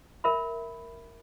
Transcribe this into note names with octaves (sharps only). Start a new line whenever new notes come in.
A#4 E5 B5